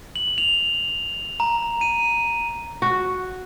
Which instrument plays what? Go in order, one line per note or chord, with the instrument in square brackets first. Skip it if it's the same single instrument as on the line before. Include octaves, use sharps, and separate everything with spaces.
[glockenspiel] F#7
F7
A#5
D#7
[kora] F#4